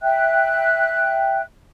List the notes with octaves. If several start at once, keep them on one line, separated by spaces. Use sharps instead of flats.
E5 G5 F#6